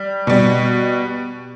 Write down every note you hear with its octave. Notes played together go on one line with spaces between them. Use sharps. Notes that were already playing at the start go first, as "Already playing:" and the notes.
Already playing: G3
B2 G3